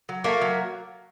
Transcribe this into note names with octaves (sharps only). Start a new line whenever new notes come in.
F#3
A3 A#3
F#3